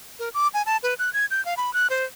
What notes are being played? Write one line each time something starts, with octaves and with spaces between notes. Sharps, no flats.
A#4
D6
G#5
A5
B4
F#6
G#6
G6
F5
B5
F#6
C5